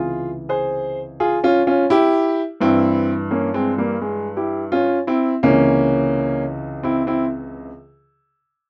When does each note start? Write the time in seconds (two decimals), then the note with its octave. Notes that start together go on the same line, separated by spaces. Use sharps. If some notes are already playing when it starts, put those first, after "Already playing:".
Already playing: C#2 C3 E3 F4 G#4
0.49 G#4 C5
1.20 F4 G#4
1.44 C#4 F4
1.67 C#4 F4
1.90 E4 G4
2.61 G2 E3 C4 E4
3.31 A#3 C#4
3.54 G#3 C4
3.78 G3 A#3
4.01 G#3
4.37 E4 G4
4.72 C#4 F4
5.07 C4 E4
5.43 C#2 C3 E3 A#3 C#4
6.83 C4 E4
7.07 C4 E4